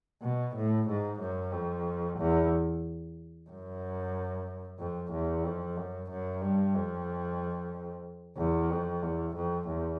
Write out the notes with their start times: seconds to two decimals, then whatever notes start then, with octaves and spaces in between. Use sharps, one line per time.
0.22 B2
0.55 A2
0.88 G#2
1.20 F#2
1.52 F2
2.18 E2
3.49 F#2
4.78 F2
5.12 E2
5.44 F2
5.77 F#2
6.10 F#2
6.42 G2
6.74 F2
8.37 E2
8.70 F2
9.03 E2
9.35 F2
9.69 E2